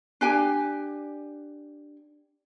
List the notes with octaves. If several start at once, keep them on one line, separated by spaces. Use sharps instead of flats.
D4 G4 G#5